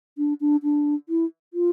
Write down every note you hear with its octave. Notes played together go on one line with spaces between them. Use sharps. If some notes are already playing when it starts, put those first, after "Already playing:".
D4
D4
D4
E4
F4